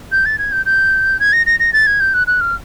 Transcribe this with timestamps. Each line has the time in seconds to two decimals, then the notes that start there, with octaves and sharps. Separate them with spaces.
0.12 G6
0.26 A6
0.39 G#6
0.52 G6
0.66 G6
1.20 G#6
1.33 A#6
1.46 A#6
1.60 A#6
1.73 A6
1.87 G#6
2.00 G6
2.14 F#6
2.27 F#6
2.41 F6